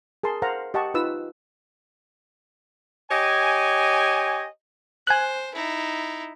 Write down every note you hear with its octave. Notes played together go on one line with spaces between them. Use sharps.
G#4 A#4 A5 C6
A#4 C5 F5 F#5 A#5
G4 D#5 F#5 A5 C#6
D#4 F4 B4 E6
G4 C#5 D#5 G#5
C5 G#5 F#6
D#4 E4